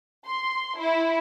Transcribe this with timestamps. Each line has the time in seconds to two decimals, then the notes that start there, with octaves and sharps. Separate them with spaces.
0.25 C6
0.77 E4